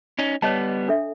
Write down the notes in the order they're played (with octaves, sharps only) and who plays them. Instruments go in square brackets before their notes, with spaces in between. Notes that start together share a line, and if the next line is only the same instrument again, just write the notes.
[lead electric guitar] C#4 D#4
[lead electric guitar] G3 B3 [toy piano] C#5 D#5 A5
[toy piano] D4 A4 E5